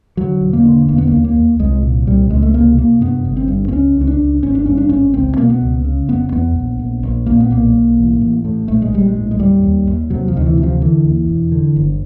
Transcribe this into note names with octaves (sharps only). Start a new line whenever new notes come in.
D3 F#3
E1
A#3
D3
E1 A#3
B3
D#2 A#3
A#3
D#2
C2 G#3
A#2
C2 G3
C#2 G#3
A3
C3 A#3
C3 A#3
G2 B3
G1
C4
G2
C4
C#2 C#4
C#2
C#4
D4
C#2
G#1 C#4
D4
G2 C#4
D4
G#1 C#4
C#2 C4
B2 A#3
B3
C#2
C#3
F1 B3
E2 B3
A#1
A#1
A#1
A#2 A#3
B3
B1 A#3
B1
A1
A1
A2
A#1 A3
G#3
A#1 G3
G#3
A2
G#3
D#2 G3
D#2
D#2
C3 F#3
F3
D2 D#3
E3
C3
F3
D3 E3
D#2
E1
D3
G1